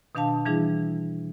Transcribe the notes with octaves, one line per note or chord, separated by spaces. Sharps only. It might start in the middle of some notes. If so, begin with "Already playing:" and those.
B2 D#3 D4 F5 A5
E3 G3 D4 E4 G#4